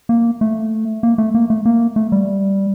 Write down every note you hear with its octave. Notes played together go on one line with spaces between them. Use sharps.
A#3
A3
A#3
A3
A#3
A3
A#3
A3
G3